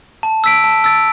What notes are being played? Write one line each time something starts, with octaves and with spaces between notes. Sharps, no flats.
A5
E6 B6 D7
A5
E6 A6 D7